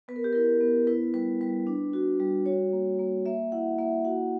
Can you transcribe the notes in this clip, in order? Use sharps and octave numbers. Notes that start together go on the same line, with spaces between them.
B3 B4
A#4
G4
E4 A#4
B3
E4 B4
G3 B4
G3 B4
D4
F#4
G3
F#4 C#5
A#3
A#3
A#3 E5
E4 F#5
A#3 E5
F#4 F#5